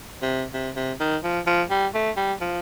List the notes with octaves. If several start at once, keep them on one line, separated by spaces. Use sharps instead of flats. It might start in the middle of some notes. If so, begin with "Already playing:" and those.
C3
C3
C3
D#3
F3
F3
G3
A3
G3
F3